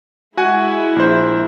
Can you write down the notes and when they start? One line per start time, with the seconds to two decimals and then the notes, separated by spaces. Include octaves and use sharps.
0.37 G#3 E4 F#4 F#5 G#5
0.96 A#1 C5